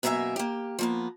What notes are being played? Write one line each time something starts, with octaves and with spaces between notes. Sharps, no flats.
F#2 B2 A#3 F4 E5 G#5
A#3 G4
F3 A#3 B3